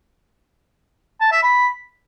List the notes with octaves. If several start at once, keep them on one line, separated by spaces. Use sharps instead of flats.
A5
E5
B5